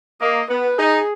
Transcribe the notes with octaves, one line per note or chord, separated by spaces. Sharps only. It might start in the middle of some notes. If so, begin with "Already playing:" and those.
A#3 D#5
B3 B4
D#4 G#4